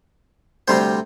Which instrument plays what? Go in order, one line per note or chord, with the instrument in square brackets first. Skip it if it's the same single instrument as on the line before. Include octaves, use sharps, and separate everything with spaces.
[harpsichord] D2 C3 G3 C4 C5